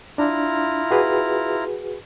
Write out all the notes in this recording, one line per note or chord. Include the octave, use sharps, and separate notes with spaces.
D4 E4 F4 A#5
F#4 G#4 B4